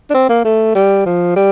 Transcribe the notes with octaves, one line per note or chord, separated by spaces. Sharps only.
D4
C4
A#3
A3
G3
F3
G3